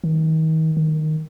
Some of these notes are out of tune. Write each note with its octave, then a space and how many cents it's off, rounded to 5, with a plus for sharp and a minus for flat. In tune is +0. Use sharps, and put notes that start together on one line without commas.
D#3 +35
D#3 -5